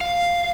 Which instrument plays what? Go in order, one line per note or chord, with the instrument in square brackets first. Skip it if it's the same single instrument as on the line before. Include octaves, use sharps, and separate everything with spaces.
[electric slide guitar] F5